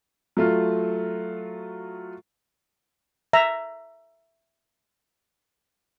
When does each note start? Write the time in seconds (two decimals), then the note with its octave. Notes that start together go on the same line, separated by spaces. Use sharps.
0.37 F#3 A3 F4
3.33 E5 A#5